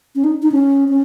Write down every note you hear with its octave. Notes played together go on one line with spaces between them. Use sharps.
C#4
D#4
D#4
C#4
C#4